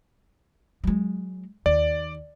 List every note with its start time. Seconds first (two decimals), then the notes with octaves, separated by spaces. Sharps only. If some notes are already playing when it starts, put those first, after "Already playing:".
0.84 F#3 G#3
1.66 D#2 D5